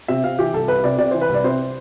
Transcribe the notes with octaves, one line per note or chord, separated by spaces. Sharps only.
C3 E5
C3 F5
E3 G4
C2 A4
C2 B4
C3 D5
C3 D5
E3 C5
B4
C2
D5
C3 C5